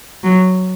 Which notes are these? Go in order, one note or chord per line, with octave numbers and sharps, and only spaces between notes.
F#3